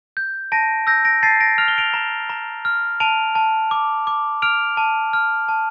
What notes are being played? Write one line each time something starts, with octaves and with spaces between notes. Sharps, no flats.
G6
A5 A#6 D7
E6 G6 A#6
A#6 D7
A5 A6 C7
A#6 D7
F6 F7
G7
D7 F7
A#5
A#5
F6
A5 D7 F7
A5
D6
D6
F6 D7 F7
A5
F6
A5